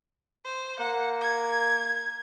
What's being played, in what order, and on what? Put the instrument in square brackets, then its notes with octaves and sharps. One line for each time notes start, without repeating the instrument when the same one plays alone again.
[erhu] C5
[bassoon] A#3 [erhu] F#5
[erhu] G#6